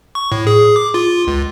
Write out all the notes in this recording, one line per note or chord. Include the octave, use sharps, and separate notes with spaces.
C#6
A2
G#4
D6
F4
C#2